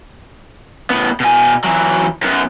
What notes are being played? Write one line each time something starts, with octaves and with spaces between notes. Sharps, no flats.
A2 B3
B2 G#5
E3 F#3
F#2 B3